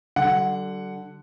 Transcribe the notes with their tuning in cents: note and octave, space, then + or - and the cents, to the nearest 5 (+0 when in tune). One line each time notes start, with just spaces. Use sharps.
D3 +5 G3 -45 F#5 +0